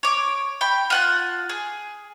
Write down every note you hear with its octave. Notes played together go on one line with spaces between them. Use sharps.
C#5 D6
G5 B5
F4 F#5 A5
G#4